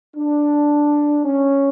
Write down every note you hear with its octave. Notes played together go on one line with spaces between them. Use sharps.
D4
C#4